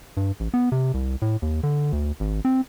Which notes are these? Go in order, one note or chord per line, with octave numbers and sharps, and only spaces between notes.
G2
A1
B3
C3
C2
A2
D#2
D3
D2
G#1
C4